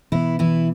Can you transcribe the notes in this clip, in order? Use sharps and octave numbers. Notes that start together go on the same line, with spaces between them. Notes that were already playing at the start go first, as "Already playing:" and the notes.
B2 E3 B3 E4
E3 E4